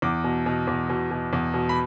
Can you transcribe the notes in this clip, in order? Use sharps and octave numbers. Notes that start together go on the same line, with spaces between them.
E2 D6
B2
B2
E2
B2
B2
E2
B2
B5